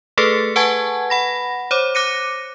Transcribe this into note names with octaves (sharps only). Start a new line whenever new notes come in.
A3 G#4 A4 B4 A6 C#7
B4 F#5 G#5 A5 C#6 G#6
F#5 B5 A#6
C5 C#5 D6
D6 F#6 A#6 C#7 D#7